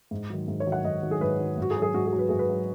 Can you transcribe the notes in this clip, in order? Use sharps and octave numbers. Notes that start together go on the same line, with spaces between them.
G#2
D#3 F#3
G#2
C#5
D#3 F#3
F#5
G#2 D#5
D#3 F#3
G#4
G#2 B4
D#3 F#3
G#2 F#4
G#4
F#3
G#4
G#2 F#4
G#4
F#3
B4
G#2 G#4
B4
F#3